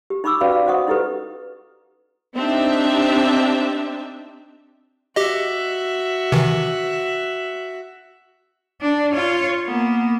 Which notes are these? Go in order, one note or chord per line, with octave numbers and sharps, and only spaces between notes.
G4
D#4 B5 C#6 D6 E6
C#4 F#4 B4 D5 F5 B5
F5
F#4 C5 D#5 F#5 C#6 D#6
D#4 E4 G4 A4 B4
C4 D4 D#4 G4 E5
F#4 G4 D#5 E5
C3 D#3 E3
D4
F4 C#5
A#3 B3